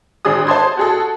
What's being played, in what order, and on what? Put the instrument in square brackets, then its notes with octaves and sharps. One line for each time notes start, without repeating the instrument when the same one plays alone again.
[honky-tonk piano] G#1 D4 G#4 D#6
C5 A5 C6 G#6
F#4 G#4 A4